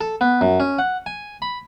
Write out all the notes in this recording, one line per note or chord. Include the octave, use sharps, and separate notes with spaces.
A4
B3
F#2
C#4
F#5
G#5
B5